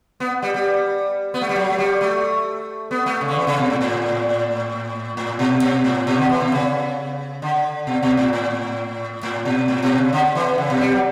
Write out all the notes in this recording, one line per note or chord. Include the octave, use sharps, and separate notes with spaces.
B3
G3
G3
B3
A3
G3
F#3
A3
G3
A3
B3
A3
C#3
D3
E3
C#3
B2
A2
A2
A2
B2
B2
A2
B2
D3
E3
B2
C#3
D3
B2
B2
A2
A2
A2
B2
A2
B2
C#3
D3
E3
C#3
B2
G3
F#3